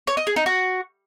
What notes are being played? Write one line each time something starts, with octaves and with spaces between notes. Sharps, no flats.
C#5
D#5
G#4
D#4
F#4